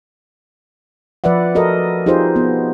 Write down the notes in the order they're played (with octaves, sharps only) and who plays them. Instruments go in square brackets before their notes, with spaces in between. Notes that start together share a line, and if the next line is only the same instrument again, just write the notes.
[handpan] F3 B4 D5 E5 F#5
F#4 A4 A#4 D#5
D#4 F4 G4 G#4 C5
B3